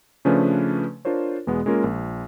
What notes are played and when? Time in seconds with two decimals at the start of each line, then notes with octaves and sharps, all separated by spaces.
0.25 C#3 F3 A3 C#4 D4 B4
1.05 D4 F4 A#4 C5 C#5
1.47 E2 B2 G#3 B3
1.66 G#3 A#3 C#4 F4 A#4
1.84 A#1